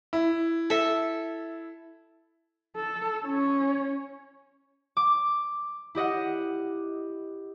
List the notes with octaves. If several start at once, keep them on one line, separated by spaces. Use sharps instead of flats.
E4
A4 E5
A4
C#4 C#5
D6
E4 G4 D#5 F#5